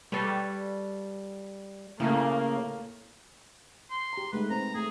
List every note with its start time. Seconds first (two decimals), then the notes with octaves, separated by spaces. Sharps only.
0.12 G3 A4 B4 C#5
2.00 A2 C#3 A3 A#3
3.90 C6
4.13 G4 A#5
4.33 G#3 A3 D#4 B4
4.50 C4 B4 A#5
4.75 A3 G#4